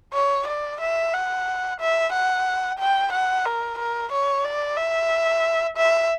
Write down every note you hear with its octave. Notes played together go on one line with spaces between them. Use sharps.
C#5
D5
E5
F#5
E5
F#5
G5
F#5
A#4
A#4
C#5
D5
E5
E5